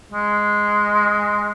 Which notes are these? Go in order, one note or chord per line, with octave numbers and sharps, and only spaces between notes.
G#3